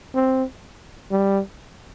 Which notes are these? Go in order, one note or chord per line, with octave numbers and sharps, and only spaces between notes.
C4
G3